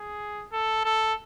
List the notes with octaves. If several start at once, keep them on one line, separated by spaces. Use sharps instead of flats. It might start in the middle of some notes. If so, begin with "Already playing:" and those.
Already playing: G#4
A4
A4